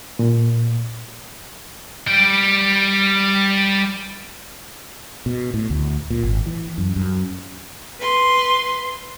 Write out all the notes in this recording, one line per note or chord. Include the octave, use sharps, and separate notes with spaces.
A#2
G3 G5
B2
A2
D2
A#2
G#1
E3
F#2
F#2
B4 C6